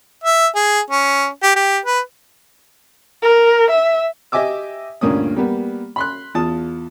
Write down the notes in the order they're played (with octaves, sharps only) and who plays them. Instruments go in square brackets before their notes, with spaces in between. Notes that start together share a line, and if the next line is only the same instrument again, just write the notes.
[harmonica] E5
G#4
C#4
G4
G4
B4
[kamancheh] A#4
E5
[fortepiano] G4 D#5 E5 G#5 D6 E6
D2 G2 A#2 A#3 C#4 D#6
G3 A#3 B3
B5 C6 F#6
E2 F4 A5 D#6